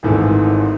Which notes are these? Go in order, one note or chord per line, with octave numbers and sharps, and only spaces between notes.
G#1 G#2 E3 A3